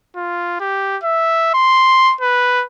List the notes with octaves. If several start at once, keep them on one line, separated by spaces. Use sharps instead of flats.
F4
G4
E5
C6
B4